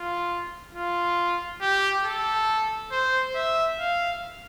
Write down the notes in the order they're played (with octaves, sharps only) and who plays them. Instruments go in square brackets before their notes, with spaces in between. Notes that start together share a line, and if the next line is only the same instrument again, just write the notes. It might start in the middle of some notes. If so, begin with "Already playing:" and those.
Already playing: [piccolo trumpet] F4
F4
G4
A4
C5
E5
F5